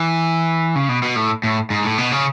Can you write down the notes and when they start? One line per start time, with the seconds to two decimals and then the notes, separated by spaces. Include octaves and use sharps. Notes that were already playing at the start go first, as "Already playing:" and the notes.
Already playing: E3
0.75 C#3
0.89 B2
1.02 B2
1.16 A2
1.44 A2
1.70 G#2
1.85 A2
1.98 B2
2.12 C#3